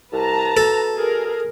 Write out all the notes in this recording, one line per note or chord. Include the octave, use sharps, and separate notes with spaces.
C2 B4 A5 A#5
B2 A4
G#4 A#4